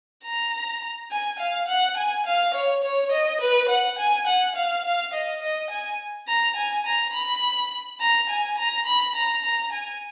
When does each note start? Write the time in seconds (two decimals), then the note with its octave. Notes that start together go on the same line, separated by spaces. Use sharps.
0.24 A#5
1.11 G#5
1.40 F5
1.68 F#5
1.97 G#5
2.26 F5
2.54 C#5
2.84 C#5
3.12 D#5
3.41 B4
3.69 F#5
3.99 G#5
4.27 F#5
4.56 F5
4.84 F5
5.14 D#5
5.42 D#5
5.71 G#5
6.28 A#5
6.56 G#5
6.86 A#5
7.14 B5
8.00 A#5
8.29 G#5
8.58 A#5
8.87 B5
9.15 A#5
9.44 A#5
9.73 G#5